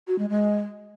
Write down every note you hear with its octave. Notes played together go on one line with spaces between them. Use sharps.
F#4
G#3
G#3